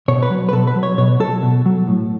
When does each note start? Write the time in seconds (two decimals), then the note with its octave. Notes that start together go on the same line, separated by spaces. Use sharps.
0.08 B2 C#5
0.22 B4
0.30 F#3
0.49 B4
0.53 B2 A4
0.67 B4
0.76 F#3
0.83 C#5
0.98 B2 C#5
1.20 F#3 A4
1.43 B2
1.66 F#3
1.87 A2